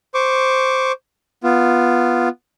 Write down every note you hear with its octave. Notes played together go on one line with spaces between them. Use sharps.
C5 C#6 D6
B3 F4